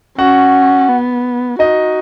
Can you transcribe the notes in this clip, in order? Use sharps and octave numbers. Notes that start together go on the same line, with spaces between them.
C#4 F#4 F#5
B3
D#4 F#4 D#5